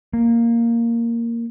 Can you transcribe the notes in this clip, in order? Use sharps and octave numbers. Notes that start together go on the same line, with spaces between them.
A#3